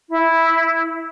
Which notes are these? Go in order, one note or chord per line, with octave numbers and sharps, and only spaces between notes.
E4